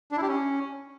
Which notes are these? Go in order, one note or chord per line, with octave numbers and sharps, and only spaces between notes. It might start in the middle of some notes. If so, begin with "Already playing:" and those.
D4
E4
G4
C#4